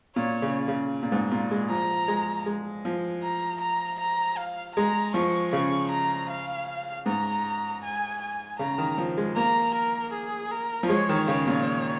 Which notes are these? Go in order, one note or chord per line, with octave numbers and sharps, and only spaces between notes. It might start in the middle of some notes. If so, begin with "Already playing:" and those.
A#2 C#5
C#3
C#3
A#2
G#2
A#2
G#3
F3 A#5
G#3
G#3
F3
A#5
A#5
A#5
F5
G#3 A#5
F3 C#6
C#3 C#6
A#5
F5
G#2 A#5
G#5
G#5
C#3 A#5
D#3
F3
G#3
A#3 A#5
A#4
G#4
A#4
F3
G#3 C#5
D#3
C#3 C#5
A#2